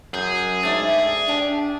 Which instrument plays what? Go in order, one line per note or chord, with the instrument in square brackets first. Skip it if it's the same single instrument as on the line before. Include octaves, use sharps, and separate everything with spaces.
[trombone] F#2 [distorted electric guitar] G#4 [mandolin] G6
[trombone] G#2 [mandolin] A3 D4 D5
[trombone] D4 [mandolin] G4